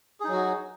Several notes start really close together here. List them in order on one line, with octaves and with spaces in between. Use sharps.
G#4 D#4 F#3 F#4